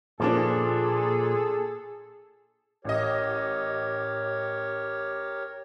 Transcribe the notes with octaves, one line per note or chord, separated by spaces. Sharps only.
A#2 F3 A#3 D4 G#4 A4
A1 G4 A#4 C#5 D#5